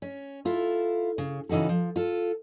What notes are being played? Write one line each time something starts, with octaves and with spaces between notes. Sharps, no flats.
C#4
E4 F4 A4
C#3
C#3 E3 D#4 F#4 A4
F3
F4 A4